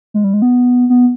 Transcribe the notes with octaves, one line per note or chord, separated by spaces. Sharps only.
G#3
G3
G#3
B3
B3